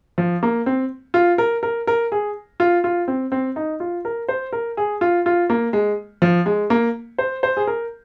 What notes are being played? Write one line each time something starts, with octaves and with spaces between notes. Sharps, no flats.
F3
A#3
C4
F4
A#4
A#4
A#4
G#4
F4
F4
C4
C4
D#4
F4
A#4
C5
A#4
G#4
F4
F4
A#3
G#3
F3
G#3
A#3
C5
C5
G#4
A#4